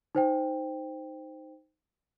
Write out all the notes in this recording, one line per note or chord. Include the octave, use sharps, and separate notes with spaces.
D#4 C5 G5